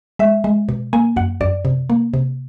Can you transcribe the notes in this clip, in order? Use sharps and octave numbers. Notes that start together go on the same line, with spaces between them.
G#3 E5
G#3
B2
A#3 G#5
F#2 F#5
F#2 D5
C3
A#3
C3